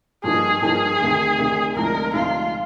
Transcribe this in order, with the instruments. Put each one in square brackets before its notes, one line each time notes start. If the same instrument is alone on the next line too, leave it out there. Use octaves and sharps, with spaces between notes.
[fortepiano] G2 F3 A#3 D#4 [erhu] G#4
[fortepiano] G2 F3 A#3 D#4 [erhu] G#4
[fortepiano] D2 C3 D#3
D2 C3 D#3
[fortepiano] D2 C3 F3 G#3 D#4 [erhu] A#4
[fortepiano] D2 C3 F3 G#3 D#4 [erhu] F4